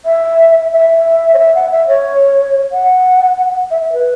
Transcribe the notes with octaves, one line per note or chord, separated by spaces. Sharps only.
E5
E5
C#5
E5
F#5
E5
C#5
F#5
E5
E5
B4